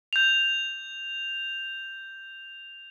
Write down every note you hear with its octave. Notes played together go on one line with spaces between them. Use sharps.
G6 F7